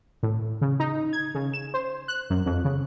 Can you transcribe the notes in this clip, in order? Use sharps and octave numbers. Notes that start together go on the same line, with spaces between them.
A2
C#3
D#4
G#6
C#3
E7
C5
F#6
F#2
F2
C#3